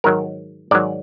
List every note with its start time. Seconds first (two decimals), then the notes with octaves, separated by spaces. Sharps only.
0.04 G#2 D#3 F#3 A#4
0.71 G#2 D#3 F#3 D5